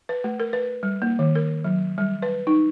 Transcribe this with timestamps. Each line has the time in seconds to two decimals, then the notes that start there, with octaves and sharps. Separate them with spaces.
0.09 B4
0.24 A3
0.40 A#4
0.53 B4
0.83 G3
1.02 A#3
1.19 D#3
1.35 A#4
1.64 F#3
1.98 G3
2.22 B4
2.47 D#4